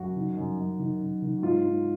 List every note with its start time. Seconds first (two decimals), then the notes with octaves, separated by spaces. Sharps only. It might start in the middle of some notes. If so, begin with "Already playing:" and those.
Already playing: F#2 F#4
0.16 D#3
0.37 F#2
0.58 F#2
0.79 D#3
1.01 F#2
1.22 D#3
1.38 F#4
1.43 G#2 F4
1.65 G#2